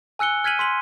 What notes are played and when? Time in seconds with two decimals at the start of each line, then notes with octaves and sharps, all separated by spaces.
0.19 G#5 E6 F#6 C#7 G7
0.44 F6 G#6 B6 D#7 F#7
0.59 C6 B6 F#7